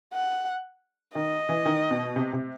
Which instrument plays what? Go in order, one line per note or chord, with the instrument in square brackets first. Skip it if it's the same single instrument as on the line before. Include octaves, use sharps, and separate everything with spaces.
[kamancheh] F#5
[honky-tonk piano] D#3 [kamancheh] D#5
[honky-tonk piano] E3
D#3
B2
C3
C3